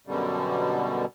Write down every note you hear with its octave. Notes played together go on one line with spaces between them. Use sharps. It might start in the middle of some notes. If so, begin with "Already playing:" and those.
F#2 B2 D3 G3